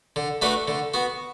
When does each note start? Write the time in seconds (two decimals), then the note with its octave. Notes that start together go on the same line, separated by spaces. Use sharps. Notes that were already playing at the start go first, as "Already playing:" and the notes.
0.16 D3
0.42 A3 D4 F#4 B4
0.68 D3
0.94 B3 F#4